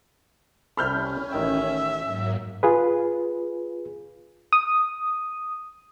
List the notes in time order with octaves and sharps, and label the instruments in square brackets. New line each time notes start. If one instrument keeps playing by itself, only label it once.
[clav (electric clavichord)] C2 C3 A4 [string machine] C#4 [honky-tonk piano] B5 F6 G6
[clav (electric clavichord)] A1 D#3 G5 [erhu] E5
[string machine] G#2 F#3 A#3
[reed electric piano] F4 G#4 B4
[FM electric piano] D#6